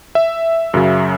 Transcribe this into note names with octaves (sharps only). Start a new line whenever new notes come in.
E5
F#2 C#3 F#3